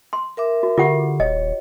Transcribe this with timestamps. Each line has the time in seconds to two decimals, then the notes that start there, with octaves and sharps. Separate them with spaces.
0.13 C6
0.37 A#4 E5 D6
0.63 F#4
0.78 D3 F4 G4 F#5
1.20 D#1 C#5 D#5